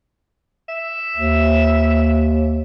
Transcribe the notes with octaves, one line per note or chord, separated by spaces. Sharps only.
E5
D#2